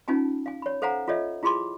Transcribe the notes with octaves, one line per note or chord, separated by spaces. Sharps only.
C#4 D#4 F4 G#5 A5
F5 G#5
C#5 B5
A4 C5 F5 F#5 G#5 A#5
F4 A4 C#5 D#5 E5
E4 F4 G#4 B5 C6 D6